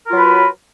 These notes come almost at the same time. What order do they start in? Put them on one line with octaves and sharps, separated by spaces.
A#4 F4 F#3 B4